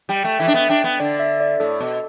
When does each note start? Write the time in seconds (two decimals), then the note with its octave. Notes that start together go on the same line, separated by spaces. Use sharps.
0.09 G3 G5
0.24 A3 G5
0.40 E3 E5
0.48 D4
0.54 B3
0.70 D4 G5
0.84 B3
1.00 D3 D5
1.20 E5
1.40 D5
1.60 A2 A4
1.80 B2